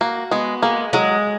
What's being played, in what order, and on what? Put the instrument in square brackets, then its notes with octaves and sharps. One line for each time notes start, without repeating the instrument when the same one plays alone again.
[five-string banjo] A#3 [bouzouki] F#4
[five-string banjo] G#3 [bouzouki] B3
[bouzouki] G#3 [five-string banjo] A#3
[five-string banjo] F#3 [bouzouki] G#3